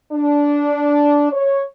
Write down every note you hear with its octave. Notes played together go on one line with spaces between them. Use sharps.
D4
C#5